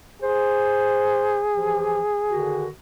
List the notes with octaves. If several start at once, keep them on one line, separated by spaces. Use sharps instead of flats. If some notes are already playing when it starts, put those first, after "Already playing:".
G#4 C5
E3 F3 G4
D3 D#3 F#4